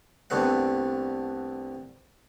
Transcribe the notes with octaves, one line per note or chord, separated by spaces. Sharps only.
C2 D3 A3 B3 F#5